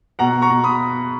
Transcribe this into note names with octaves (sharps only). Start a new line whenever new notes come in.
B2 F#5 A#5
A#5 C#6
B2
B5 D#6